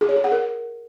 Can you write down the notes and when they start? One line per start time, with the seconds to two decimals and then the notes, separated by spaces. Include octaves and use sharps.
0.01 G#4
0.09 C#5
0.16 G#4
0.24 F#5
0.32 A#4